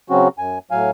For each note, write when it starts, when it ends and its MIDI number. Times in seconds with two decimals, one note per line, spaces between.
0.10 0.28 49
0.10 0.28 54
0.10 0.28 60
0.10 0.28 61
0.10 0.28 66
0.38 0.58 42
0.38 0.58 80
0.71 0.91 45
0.71 0.91 54
0.71 0.91 77
0.71 0.91 80